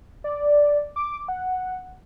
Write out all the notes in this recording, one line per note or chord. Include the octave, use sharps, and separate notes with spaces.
D5
D6
F#5